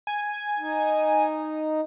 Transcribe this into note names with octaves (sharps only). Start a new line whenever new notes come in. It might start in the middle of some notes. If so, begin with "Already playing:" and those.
G#5
D#4